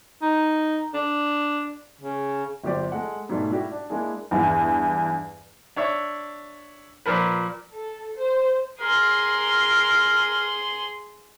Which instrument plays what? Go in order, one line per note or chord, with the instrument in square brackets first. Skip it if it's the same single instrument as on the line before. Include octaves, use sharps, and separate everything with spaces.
[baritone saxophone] D#4
D4
C#3
[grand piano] G1 F#3 G3 G4 C5 D5
G#3 A4 F#5
G#2 B2 G3 A3
G3 E4 F#4 G4
D4
G#3 A#3 D4 E4 G#4
[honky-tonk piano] E2 G2
[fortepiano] D4 C#5 E5
A#2 F3 A#4 B4
[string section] A4
C5
[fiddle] G#4 C6 [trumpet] A#4